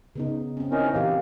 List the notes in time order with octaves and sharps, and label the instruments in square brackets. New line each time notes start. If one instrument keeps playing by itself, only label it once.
[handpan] C#3 B3 D#4
C4 C#4
[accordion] C#4 D#4 A#4 [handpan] E4
[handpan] A#2 E3 G4 [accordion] A#3